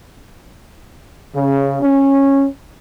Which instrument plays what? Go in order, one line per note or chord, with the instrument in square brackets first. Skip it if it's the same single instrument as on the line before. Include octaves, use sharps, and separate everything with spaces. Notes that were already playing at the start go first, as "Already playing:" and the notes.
[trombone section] C#3
C#4